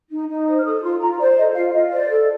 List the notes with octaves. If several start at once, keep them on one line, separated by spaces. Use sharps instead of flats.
D#4
D#4
C5 D#6
F6
A4 D#6
F4 C6
F4 A#5
C5 D5
A4 D#5
F4 F5
F4 D#5
C5 D5
A4